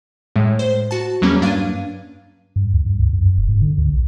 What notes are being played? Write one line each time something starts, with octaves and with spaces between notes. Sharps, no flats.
A2 G#3
C5
F#4 A5
E2 F#3 G3 A#3 C#4
G2 D4 F5 G#6 D#7
G2
D2
G2
C#2
F#2
F1
G#2
D3
D2
B1